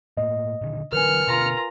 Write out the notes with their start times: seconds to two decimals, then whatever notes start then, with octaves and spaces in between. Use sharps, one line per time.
0.17 A2 A#3 D#5
0.61 A#2 D3 D#3
0.93 D3 E3 F#3 A#4 B4 G#5 F6 C#7
1.27 B2 D3 F4 A#5